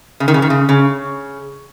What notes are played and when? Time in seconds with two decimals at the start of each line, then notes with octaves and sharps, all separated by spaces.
0.20 C#3
0.28 D#3
0.34 C#3
0.42 D#3
0.50 C#3
0.69 C#3